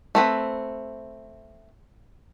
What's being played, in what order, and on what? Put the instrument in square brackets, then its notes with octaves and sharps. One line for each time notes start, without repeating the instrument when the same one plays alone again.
[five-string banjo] A3 C4 B4